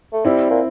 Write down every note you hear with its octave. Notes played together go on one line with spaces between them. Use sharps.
A3
G3 C4 E4
A#2